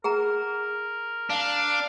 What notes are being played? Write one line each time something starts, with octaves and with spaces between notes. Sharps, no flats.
G#4 A#4 F#5 A#5
D4 F5